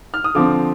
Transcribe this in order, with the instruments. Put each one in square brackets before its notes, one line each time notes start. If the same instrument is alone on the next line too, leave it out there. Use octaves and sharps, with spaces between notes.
[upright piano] F6
D#6
D3 F3 C4 D6